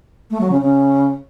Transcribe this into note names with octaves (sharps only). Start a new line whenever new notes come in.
A3
F#3
C#3
C#3